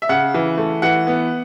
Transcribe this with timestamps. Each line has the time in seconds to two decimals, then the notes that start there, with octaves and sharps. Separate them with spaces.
0.02 E5
0.09 C#3 F#5
0.34 E3
0.57 A3
0.82 E3 F#5
1.07 B3